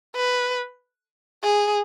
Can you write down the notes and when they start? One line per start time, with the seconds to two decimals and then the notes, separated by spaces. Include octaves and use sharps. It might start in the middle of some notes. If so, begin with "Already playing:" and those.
0.16 B4
1.43 G#4